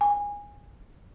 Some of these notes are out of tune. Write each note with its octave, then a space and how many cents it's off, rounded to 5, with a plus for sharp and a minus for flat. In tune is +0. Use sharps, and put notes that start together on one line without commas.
G#5 -20